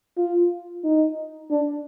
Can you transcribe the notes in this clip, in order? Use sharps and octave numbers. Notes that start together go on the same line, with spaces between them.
F4
D#4
D4